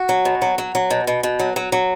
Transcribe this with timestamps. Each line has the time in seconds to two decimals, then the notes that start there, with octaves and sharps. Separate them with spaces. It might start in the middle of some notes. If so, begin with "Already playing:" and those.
Already playing: F#4
0.09 F#3
0.25 B2
0.42 F#3
0.58 F#3
0.75 F#3
0.90 B2
1.07 B2
1.23 B2
1.39 F#3
1.56 F#3
1.72 F#3